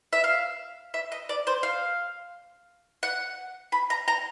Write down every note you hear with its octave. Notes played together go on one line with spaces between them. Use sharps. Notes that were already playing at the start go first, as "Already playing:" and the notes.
E5
F5
E5
D#5
D5
C5
F5
F#5
B5
A#5
A#5